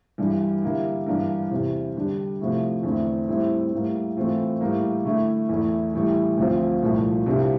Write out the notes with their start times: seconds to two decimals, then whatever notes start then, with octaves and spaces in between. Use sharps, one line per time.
0.18 G2 E3 G3 D4
0.62 D3 G3 A#3 E4
1.07 G2 E3 A#3 D4
1.51 E2 C3 E3
1.96 D3 G3 D4
2.40 C3 F3 A3 E4
2.83 E2 D3 A3 C4 E4
3.28 A2 G3 C4 E4
3.73 A2 G3 A#3
4.17 A2 E3 A3 C4 F4
4.61 A2 G3 A#3
5.04 D3 A3 E4
5.49 E2 E3 A3 E4
5.94 A2 E3 G3
6.37 D2 D3 F3 C4 F4
6.82 C2 A#2 F3 A3
7.26 C2 C3 G3 D4 F4